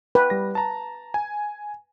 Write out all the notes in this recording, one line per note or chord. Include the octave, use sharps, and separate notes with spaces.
B4 G5
G3 A#6
A5 A#5
G#5